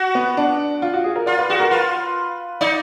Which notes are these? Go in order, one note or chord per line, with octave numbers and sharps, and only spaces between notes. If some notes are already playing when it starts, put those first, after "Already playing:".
Already playing: F#4
B3
D4
F4
F#4
G#4
A#4
F4 D5
B4
F#4 G#4
A#4
F4 B4
D#4 D5